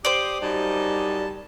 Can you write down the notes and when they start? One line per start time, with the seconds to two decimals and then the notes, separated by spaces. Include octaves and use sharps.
0.05 G4 C5 D5 D6 D#6
0.43 F#2 G3 D#4 A5